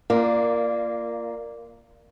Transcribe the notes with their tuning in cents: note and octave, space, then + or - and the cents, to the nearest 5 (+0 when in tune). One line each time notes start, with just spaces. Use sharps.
A#3 +0 F4 -25 D5 +10